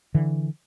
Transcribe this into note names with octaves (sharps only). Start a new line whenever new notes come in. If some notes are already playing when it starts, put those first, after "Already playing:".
D3 E3